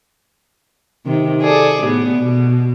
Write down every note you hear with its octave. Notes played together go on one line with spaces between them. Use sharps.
C3 D#3
G#4 A4 D5
A2 B3
B2